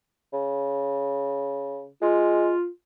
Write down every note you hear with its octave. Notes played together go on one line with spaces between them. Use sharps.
C#3
G#3 F4